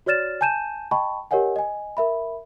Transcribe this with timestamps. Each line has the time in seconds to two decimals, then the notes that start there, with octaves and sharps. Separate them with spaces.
0.06 F#4 C#5 D5 F6 A6 E7
0.41 G#5 A5 G6 D#7 E7
0.91 D#5 G5 A5 B5 C#6
1.31 G4 A#4 C#5 D#5 F#5 G#5
1.56 D#5 G#5
1.97 A#4 E5 B5